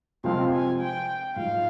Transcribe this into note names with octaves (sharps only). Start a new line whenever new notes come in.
C3 F3 G#3 C4 F5
G#5
G5
G#2 F3 G#3 F5